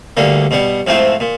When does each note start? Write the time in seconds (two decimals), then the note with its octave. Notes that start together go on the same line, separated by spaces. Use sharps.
0.17 D2 D3 G3 A#3
0.51 B2 G3 B3
0.87 G#2 F3 A3 C4 E4
1.20 A#2